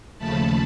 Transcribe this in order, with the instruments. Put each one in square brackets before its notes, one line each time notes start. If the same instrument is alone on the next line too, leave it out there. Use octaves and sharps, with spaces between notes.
[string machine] D#2 C#3 F3 A3 A5 B5